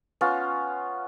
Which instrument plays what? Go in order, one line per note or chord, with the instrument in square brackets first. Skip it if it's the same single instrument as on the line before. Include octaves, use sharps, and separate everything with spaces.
[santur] B3 C#4 F4